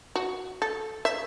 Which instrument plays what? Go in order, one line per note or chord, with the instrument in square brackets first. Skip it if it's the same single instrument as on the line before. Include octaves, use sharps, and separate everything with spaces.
[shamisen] F#4
A4
E5